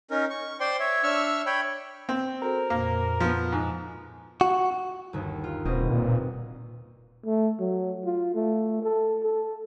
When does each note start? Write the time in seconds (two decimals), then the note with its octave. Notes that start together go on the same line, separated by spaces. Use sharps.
0.11 C#4 D#4 A#4
0.30 C#6
0.60 C5 D5 G5 C6
0.80 C#5 E5
1.03 D4 E5 C#6 E6 F6
1.46 C#5 G5 B5
2.09 C4
2.43 F#4 A4 A#4 C5
2.70 F2 A#2 A#3
3.20 F3 B3
3.52 G#2
4.41 F#4
5.13 G1 D#2
5.44 F4
5.65 D#1 B2 C4 D#5
5.90 A#2
7.25 A3
7.59 F#3
8.05 F4
8.34 A3
8.82 A4
9.23 A4